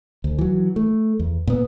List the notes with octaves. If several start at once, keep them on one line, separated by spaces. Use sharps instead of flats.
D2
E3 F#3
A3
E2
A#2 B3